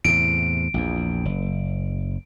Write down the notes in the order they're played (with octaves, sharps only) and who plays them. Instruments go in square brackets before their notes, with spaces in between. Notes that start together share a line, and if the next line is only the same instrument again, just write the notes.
[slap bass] E2 A2 C3 [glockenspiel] D7
[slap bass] A#1 E2
F#1